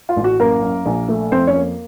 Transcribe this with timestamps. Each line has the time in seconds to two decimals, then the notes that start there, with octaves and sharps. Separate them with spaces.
0.09 F4
0.16 A1
0.24 F#4
0.40 F#2 A#3 A#4
0.62 F#2
0.86 A#1
1.08 A3
1.32 F2 C4 C5
1.47 C#4 C#5
1.55 A#3